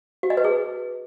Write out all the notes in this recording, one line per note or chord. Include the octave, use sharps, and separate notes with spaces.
F#4
D#5
B4
G#4